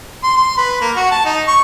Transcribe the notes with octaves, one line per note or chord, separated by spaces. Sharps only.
C6
C6
B4
A#3
F#4
A5
D#4
C#6